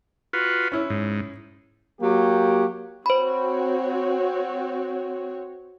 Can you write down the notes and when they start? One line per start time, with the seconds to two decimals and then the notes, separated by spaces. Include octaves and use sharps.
0.33 F4 F#4 B4
0.72 C#4 E4
0.90 G#2
2.01 F#3 A#3 G4
3.06 C4 F#4 C5 C#5 B5